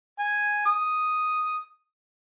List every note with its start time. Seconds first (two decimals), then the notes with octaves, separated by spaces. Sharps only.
0.19 G#5
0.66 D#6